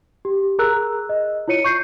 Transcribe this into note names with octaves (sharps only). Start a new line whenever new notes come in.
G4
G#4 A#4 A#5 E6 F#6
D#5
E4 F4 C#5 C#7 D#7
C#6 G6 C7